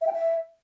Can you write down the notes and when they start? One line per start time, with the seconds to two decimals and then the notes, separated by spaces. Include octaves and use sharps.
0.01 E5
0.07 G5
0.13 E5